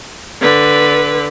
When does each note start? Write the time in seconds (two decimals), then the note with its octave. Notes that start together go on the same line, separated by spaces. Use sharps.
0.41 D3 B4